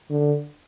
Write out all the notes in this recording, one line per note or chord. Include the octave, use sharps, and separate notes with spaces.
D3